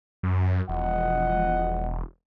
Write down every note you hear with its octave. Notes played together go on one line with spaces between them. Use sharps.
F#2
E1 F3 D#5 F#5